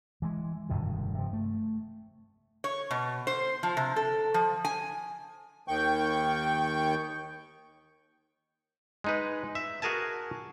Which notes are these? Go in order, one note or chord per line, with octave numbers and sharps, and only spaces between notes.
E3 G#3
F1 G2 B2 D#3
C3 F3
A3
C#5
B2
C5
F3
C3
A4
F3
G#5
D#2 D#3 G5 C#6 G6
G#3 D#4 B4
E5
F#4 G#4 A#4 G#5 A5